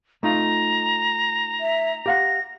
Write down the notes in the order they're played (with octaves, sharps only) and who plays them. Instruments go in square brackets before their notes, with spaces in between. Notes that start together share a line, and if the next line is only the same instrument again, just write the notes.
[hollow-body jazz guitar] A3 D#4 F4 [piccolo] A#5
[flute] E5
[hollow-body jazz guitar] G4 F5 F#5 [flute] A#6